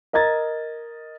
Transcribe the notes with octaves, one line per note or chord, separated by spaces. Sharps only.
A#4 D#5 A#5 G#6 A6